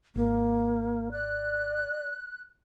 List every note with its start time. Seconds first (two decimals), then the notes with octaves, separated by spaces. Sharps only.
0.16 G#1 A#3
1.12 D5 F#6